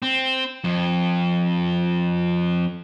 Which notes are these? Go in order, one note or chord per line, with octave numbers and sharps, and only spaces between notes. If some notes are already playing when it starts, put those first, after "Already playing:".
C4
F2